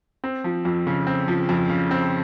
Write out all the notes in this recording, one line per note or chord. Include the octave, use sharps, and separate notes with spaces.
C4
F3
F2
C#3
C4
F3
F2
C#3
C4